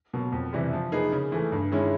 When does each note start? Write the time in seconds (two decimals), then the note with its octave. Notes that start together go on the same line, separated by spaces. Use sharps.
0.13 B2 F#3 A#3
0.32 F2
0.53 C3 E3 G3
0.73 F3
0.92 A#3 D#4 G#4 B4
1.12 C#3
1.32 E3 A3
1.52 G2
1.71 D#3 G#3 C#4 E4